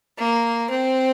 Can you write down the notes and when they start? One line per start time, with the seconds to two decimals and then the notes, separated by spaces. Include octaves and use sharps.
0.18 A#3
0.70 C4